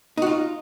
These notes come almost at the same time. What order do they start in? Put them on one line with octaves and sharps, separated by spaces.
D#4 F#4 F4